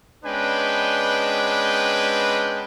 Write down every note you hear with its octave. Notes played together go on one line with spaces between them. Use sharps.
G#3 B3 C#4 D4 B4 G5